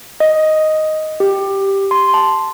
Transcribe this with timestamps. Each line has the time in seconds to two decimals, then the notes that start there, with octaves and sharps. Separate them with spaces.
0.20 D#5
1.20 G4
1.91 C6
2.14 A5